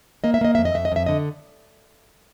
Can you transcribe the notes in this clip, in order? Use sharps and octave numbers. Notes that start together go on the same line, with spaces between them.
A#3 D#5
E5
A#3 D#5
F2 E5
D#5
F2 E5
D#5
F2 E5
D3 D#5